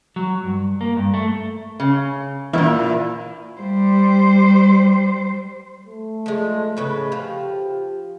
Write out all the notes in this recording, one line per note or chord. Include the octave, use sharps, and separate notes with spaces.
F#3
G2
A#3
G2
A3
C#3
E2 A#2 E4
G3 C5
A3
F3 G#3
A2 C#3 B4
F3 G4